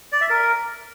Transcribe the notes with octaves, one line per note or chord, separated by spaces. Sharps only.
D5
E5
A#4